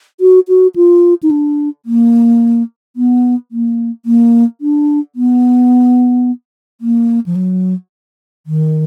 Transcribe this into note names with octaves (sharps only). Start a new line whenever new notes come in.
F#4
F#4
F4
D#4
D4
A#3
B3
A#3
A#3
D4
B3
A#3
F3
F#3
D#3